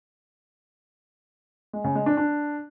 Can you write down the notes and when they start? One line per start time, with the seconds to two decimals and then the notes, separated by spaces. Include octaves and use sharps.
1.73 G#3
1.84 C#3
1.95 G#3
2.06 D4
2.17 D4